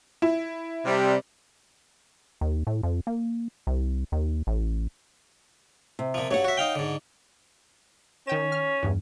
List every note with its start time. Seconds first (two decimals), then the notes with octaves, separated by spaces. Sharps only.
0.22 E4
0.85 C3 G3
2.41 D#2
2.67 A2
2.83 F2
3.07 A#3
3.67 C2
4.12 D#2
4.47 A1
5.99 C3
6.14 A#2 F3
6.31 G2 F#3 C#5 F#5
6.44 F#4 E5
6.57 D#4 F5 G5
6.75 G#2 D3
8.27 D#3 C#4 G5 E7
8.52 F6
8.83 E2 G2